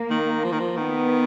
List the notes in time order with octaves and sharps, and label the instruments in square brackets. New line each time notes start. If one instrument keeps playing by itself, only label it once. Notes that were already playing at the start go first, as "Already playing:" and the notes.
Already playing: [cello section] A#3
[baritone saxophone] D#3
F3
D#3
F3
[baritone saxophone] D#3 [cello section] B3